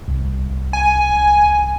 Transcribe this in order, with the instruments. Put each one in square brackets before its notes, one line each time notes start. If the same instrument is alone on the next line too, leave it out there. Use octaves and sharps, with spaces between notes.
[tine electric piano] C2
[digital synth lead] G#5